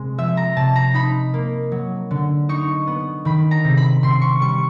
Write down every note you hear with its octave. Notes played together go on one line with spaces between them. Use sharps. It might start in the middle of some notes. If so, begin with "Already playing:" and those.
Already playing: C3 G#3
F3 E5
A#5
C3 A5
A#5
D#4 B5
A#3
F#3
D3
D#4 C#6
B3
D#3 B5
A#5
C3
B5
C3 C6
C#6
G3 C#6